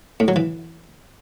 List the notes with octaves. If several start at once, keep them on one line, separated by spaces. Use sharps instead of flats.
A2
F#3
E3